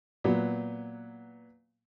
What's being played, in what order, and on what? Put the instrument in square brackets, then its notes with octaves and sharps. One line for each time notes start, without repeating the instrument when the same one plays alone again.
[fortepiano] A#2 F#3 B3